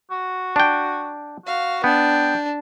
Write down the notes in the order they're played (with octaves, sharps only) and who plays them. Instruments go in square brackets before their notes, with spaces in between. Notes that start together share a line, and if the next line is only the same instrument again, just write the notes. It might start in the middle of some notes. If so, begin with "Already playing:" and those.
[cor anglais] F#4
[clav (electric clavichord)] D4 G5
[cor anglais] F#4 [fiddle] F5
[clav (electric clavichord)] B3 [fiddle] D4 [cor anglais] G5